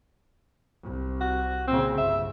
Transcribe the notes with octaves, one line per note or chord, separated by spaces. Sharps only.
C2
F#4
A#2 C#3 C4
G1 E5